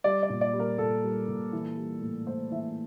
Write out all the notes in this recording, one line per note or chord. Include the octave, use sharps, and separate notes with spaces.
G3 D5
D5
A#2
D5
G3
A#4
A#2 A4
G3
A#2
E3
G3
A2
A2 C5
E3 E5